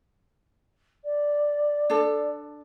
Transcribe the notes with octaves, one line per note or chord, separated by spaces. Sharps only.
D5
D4 A4